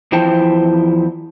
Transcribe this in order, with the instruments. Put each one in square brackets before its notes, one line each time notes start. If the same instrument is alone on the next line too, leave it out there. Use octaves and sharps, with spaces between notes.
[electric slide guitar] E2 F3 E4 C5 G5 A5